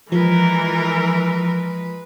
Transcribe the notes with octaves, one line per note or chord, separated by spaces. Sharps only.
E3 F3 G#3 A#4 B4